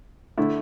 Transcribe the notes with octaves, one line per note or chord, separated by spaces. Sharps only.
D3 A3 E4